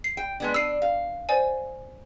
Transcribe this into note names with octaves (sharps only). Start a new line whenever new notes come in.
C7
G5
G#3 B3 D4
D4 E6 C7 D#7
F5
C5 D5 G#5